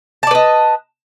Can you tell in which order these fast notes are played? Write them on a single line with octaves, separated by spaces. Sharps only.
A5 D5 B4 D#5